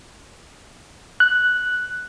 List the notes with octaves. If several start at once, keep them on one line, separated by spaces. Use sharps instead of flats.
F#6